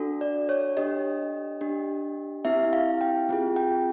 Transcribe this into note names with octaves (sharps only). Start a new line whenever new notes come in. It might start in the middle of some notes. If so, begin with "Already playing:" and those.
Already playing: D4 F#4 A4
D5
C#5
D4 G4 D#5
D4 G4
C4 E4 G4 E5
F5
G5
C4 F4 G#4
G5